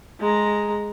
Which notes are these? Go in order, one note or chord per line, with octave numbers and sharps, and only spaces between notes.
G#3 A#5